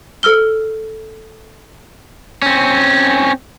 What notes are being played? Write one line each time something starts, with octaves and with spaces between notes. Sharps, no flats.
A4 E6 F6 G7
C4 C#4